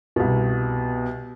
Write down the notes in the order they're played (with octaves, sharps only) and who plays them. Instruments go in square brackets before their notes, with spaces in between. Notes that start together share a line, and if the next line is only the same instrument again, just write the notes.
[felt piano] C2 B2